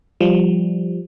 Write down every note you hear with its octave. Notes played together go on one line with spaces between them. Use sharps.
F3 G3